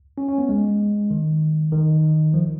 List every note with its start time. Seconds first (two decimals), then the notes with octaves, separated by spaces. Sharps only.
0.18 C#4
0.28 C#4
0.38 B3
0.49 G#3
1.10 D#3
1.72 D#3
2.34 F3